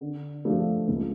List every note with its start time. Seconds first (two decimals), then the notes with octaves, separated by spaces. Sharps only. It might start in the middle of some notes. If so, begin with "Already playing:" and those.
0.01 D3
0.45 F3 A3 D4
0.87 C#2